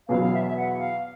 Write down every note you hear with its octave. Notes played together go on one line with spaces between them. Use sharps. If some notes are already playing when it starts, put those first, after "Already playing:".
E2 B2 F#3 B3 F5
F5
E5
E5
F#5
F5